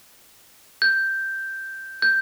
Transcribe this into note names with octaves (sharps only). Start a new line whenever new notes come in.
G6
G6